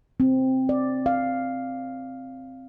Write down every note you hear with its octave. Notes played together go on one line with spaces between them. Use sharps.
C4
D5
F5